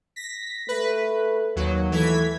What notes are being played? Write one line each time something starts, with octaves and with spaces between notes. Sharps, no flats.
A#6 B6
A3 B4
D#2 F#3
E3 A3 G#6 B6